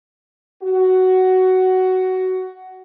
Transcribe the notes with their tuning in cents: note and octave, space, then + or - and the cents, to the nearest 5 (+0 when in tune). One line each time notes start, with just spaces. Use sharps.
F#4 +10